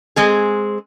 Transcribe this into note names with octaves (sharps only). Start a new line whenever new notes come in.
G#3 C4 G#4